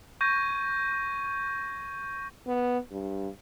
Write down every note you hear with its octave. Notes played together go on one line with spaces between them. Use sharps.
C#6 G6 G#6 A#6 D#7
B3
G2